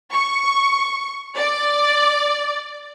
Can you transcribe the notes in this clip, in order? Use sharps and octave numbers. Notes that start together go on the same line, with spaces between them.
C#6
D5